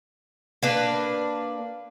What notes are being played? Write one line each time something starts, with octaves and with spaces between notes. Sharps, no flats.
A#3 D4 B4